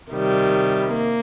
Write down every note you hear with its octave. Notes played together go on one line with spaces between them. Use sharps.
C3 D#3 G3
A#3